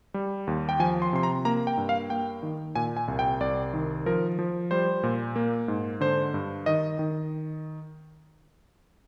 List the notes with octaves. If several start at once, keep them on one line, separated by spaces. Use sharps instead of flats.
G3
D#2
G5
F3 G#5
C6
C3 C6
A#5
A#3 A#5
G5
G2
F5
A#3 G5
D#3
A#2 G#5
G#5
C2
G5
C2 D5
D#3
F3 A#4
F3
G3 C5
A#2
A#3
G#2
D3 C5
G2
D#3 D#5
D#3